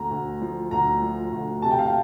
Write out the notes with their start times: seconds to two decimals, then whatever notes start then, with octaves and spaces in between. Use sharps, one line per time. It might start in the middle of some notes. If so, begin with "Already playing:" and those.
Already playing: D2 A#5
0.11 D2
0.41 F3
0.71 D2 A#5
1.02 F3
1.32 D2
1.62 C3 A5
1.71 G5
1.79 F5
1.87 G5